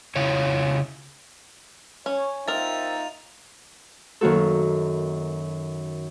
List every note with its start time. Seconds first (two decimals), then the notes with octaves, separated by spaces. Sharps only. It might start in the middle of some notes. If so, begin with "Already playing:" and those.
0.16 C#3 E4 F4 C#5
2.06 C#4 C#5
2.48 C4 D#4 F4 A#4 E5 A6 F7
4.21 F#2 D#3 A#3 F#4 A4